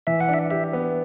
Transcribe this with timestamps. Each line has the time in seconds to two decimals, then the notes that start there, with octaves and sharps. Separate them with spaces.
0.07 E3 E5
0.21 F#5
0.28 D4
0.34 E5
0.51 G4 E5
0.73 B3